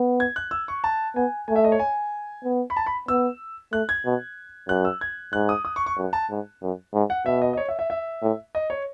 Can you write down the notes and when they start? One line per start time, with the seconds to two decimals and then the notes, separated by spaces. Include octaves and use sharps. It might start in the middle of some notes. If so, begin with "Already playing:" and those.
Already playing: B3
0.20 G#6
0.36 F#6
0.51 E6
0.68 C#6
0.84 A5
1.16 B3 G#5
1.48 A3 G#5
1.56 E5
1.64 D#5
1.72 C#5
1.80 G#5
2.44 B3
2.70 B5
2.77 A5
2.86 B5
3.08 B3 E6
3.72 A3 F#6
3.89 G#6
4.05 B2
4.68 F#2 F#6
4.85 E6
5.01 G#6
5.33 G#2 F#6
5.49 D#6
5.65 D#6
5.76 C#6
5.86 C#6
5.97 F#2
6.13 A5
6.30 G#2
6.62 F#2
6.94 G#2
7.10 F#5
7.25 B2 E5
7.42 D#5
7.53 D#5
7.57 C#5
7.69 E5
7.79 E5
7.90 E5
8.22 A2
8.55 D#5
8.70 C#5